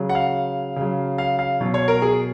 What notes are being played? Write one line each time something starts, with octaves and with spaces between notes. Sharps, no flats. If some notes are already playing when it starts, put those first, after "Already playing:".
Already playing: C#3 F#3
F#5
F5
C#3 F#3
F5
F5
B2 F#3
C#5
A#4
G#4